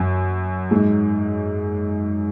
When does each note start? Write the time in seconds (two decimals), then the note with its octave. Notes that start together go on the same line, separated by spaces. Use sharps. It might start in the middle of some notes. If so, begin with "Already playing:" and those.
Already playing: F#2
0.71 G#2